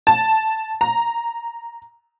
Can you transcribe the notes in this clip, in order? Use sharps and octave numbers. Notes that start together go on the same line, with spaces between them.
A5
A#5